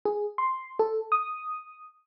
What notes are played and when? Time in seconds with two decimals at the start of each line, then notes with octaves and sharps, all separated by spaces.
0.05 G#4
0.38 C6
0.79 A4
1.12 D#6